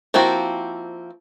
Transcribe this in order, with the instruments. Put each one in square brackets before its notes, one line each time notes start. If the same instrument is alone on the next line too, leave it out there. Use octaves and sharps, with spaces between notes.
[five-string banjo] F3 A#3 C4 E4 F#4